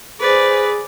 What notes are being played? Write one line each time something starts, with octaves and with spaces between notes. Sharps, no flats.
G#4 B4 C5 D5